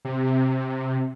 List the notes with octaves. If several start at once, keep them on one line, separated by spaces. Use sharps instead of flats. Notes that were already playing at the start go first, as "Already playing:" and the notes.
C3